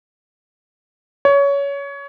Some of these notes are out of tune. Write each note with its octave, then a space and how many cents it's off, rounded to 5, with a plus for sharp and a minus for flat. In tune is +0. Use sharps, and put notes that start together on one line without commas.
C#5 +20